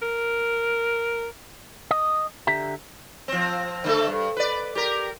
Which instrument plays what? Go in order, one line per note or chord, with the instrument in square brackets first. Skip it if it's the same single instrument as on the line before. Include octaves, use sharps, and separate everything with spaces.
[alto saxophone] A#4
[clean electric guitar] D#5
D3 G4 E5 A#5
[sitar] F3 C4
D3 A3 A4
G2
B4 D5
G4 A#4